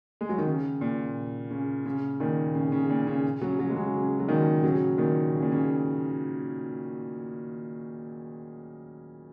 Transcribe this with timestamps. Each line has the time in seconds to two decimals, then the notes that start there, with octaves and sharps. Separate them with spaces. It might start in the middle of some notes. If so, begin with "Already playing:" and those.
0.21 G#3
0.29 F#3
0.38 D#3
0.47 C#3
0.81 A#2
1.51 C#3
1.85 C#3
2.20 A#2 D#3
2.55 C#3
2.72 C#3
2.89 A#2
3.07 C#3
3.41 C#3 F#3
3.59 C#3 F#3
3.70 G#3
3.76 C#3 F#3
3.94 C#3
4.19 F#3
4.28 A#2 D#3
4.63 C#3 F#3
4.98 A#2 D#3
5.32 C#3
5.42 A#2
5.52 C#3